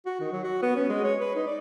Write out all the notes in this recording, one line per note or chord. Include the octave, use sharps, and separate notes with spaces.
F#4
D#3
F#3
F#4
B3
C#4
G#3
C#5
B4
D#4
D5